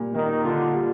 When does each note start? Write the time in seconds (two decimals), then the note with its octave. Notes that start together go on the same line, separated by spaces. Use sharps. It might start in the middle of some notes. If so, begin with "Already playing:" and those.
Already playing: A#2 G3
0.15 D#3 A#3
0.45 D3 F4
0.75 G3